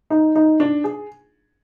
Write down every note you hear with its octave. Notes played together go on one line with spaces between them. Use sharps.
D#4
D#4
D4
G#4